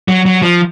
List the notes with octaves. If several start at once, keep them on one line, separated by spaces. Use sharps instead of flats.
F#3
F#3
F3